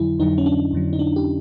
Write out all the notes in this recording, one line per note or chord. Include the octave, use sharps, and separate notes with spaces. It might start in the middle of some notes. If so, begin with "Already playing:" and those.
Already playing: F2 D3 F#3 E4
F2 D3 F#3 D#4
C#4
D4
F2 D3 F#3
D#4
D4
G4